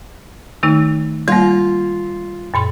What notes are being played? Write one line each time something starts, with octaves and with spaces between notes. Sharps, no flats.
D#3 A3 D#4
G3 A#3 F4
F#2 A#2 C6